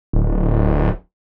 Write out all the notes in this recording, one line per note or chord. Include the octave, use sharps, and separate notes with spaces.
D1